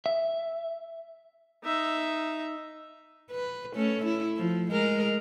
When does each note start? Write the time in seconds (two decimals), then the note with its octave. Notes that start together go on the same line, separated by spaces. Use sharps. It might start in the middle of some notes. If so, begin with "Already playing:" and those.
0.06 E5
1.64 D#4 E5
3.31 B4
3.76 A3 C#4
4.05 E4
4.37 F3
4.71 G#3 A#4